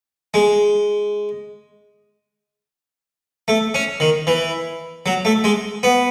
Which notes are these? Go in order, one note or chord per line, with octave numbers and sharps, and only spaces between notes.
G#3
A3
C#4
D#3
E3
F#3
A3
G#3
B3